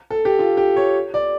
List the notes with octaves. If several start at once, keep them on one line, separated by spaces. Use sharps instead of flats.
A4
G4
F4
G4
C#5
D5